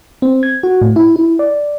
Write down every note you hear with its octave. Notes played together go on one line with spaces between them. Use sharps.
C4
G#6
F#4
A2
E4
E4
D5